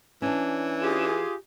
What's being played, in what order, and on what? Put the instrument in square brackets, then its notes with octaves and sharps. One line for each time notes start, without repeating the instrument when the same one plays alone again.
[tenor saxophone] E3 [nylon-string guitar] C#4 D4
[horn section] F4 G4 G#4